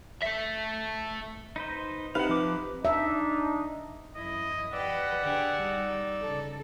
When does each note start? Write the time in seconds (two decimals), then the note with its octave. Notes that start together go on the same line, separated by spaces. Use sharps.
0.23 A4 E5
1.56 D#4 B4 C5
2.15 C3 D#4 B4 F5 F#5
2.29 F3 D6
2.85 D4 D#4 E5
4.16 F#2 E4 D#5
4.73 G4 B4 D5 D#5 F#5 E6
5.22 D3 G4 G#4
5.60 G3 D#4
6.22 C#3 A4